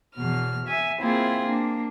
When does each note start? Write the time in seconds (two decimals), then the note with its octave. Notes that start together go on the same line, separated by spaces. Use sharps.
0.15 E2 B2 F6
0.66 E5 G#5
0.99 A#3 C4 E4 F4 G#4
1.44 A#3 D4